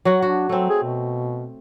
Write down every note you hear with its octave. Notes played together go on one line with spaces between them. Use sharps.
F#3 F#4 F#5
D4 F#4
F#3 A3 C4
G#4
B2